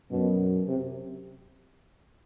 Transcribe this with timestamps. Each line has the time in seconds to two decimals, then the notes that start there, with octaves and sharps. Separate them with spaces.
0.11 F#2 B2
0.67 C3